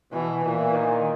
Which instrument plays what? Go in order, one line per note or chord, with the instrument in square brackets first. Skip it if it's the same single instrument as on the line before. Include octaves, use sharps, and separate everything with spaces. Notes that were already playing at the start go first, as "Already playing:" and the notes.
[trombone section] B2 [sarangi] E3
[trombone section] A#2 [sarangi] E3
[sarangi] D#3